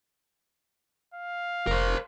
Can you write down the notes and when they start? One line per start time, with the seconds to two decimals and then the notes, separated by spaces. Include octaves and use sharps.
1.14 F5
1.67 F1 A#4 C5